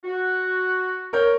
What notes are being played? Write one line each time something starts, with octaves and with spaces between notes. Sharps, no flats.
F#4
A#4 C#5 G6